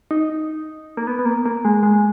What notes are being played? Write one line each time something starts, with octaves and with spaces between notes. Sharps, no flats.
D#4
A#3
B3
B3
A#3
A#3
G#3
G#3